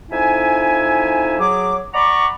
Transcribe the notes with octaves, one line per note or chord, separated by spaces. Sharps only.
F2 D#4 E4 E5 G#5
F#3 G#4 D6
D5 F#5 A#5 B5 C#6 D6